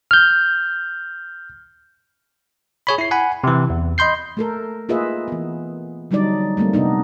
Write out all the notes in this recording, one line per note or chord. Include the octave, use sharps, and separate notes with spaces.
F6 G6
G#4 C#5 B5
E4 C7
F#5 G#5 B5
C3 E3
E2
D#5 B5 C6 G6 C7
A3 A4 A#4
A#3 F4 G#4 B4 D#5 E5
E3 B3
D3 F#3 G3 D4 D#4 D5
G3 A3 A#3 C4
C3 B3 D4 D#4